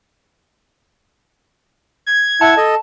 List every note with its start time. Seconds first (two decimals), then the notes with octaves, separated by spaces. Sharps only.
2.06 G#6
2.41 E4 F#5 A5
2.57 A4 D#5